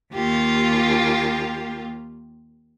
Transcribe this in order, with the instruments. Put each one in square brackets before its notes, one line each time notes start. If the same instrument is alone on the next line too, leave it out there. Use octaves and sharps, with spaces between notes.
[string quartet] D#2 A#3 F4 G4